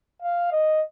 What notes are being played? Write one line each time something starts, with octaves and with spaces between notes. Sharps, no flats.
F5
D#5